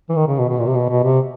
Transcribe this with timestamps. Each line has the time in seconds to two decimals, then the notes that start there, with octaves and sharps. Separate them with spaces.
0.09 E3
0.15 D#3
0.27 C#3
0.38 B2
0.49 B2
0.59 A#2
0.68 C3
0.75 B2
0.89 B2
1.04 C3